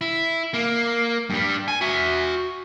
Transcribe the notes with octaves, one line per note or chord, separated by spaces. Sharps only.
E4
A#3
G2 G3
G#5
F#4 E5